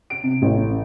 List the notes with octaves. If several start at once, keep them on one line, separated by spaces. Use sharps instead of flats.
D7
C3
A1